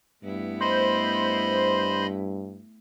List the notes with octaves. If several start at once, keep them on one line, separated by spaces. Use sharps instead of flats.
G2 A3 B3 E4
C5 D#5 B5